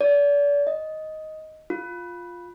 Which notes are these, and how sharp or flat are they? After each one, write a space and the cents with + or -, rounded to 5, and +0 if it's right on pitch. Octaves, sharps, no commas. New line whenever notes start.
D5 -35
D#5 +5
F4 +10